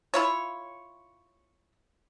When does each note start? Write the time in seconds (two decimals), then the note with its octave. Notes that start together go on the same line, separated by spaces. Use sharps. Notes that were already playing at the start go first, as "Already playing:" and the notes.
0.14 E4 F4 C#5